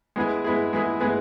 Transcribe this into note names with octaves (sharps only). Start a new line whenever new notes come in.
G#3 B3 E4 G#4
G#3 B3 E4 G#4
G#3 B3 E4 G#4
G#3 B3 E4 G#4